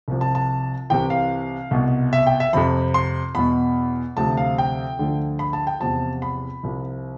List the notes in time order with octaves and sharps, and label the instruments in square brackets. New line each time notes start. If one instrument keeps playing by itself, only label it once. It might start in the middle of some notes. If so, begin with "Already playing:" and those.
[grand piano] C2 C3 F3
A5
A5
C2 C3 E3 G5
F5
C2 B2
E5
G5
E5
F2 C3 F3 B5
C6
E2 B2 B5
D2 C3 F3 A5
F5
G5
D2 D3 F3
B5
A5
G5
E2 C3 F3 A5
B5
C2 C3 F3